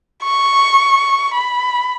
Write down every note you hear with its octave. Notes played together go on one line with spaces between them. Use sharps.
C#6
B5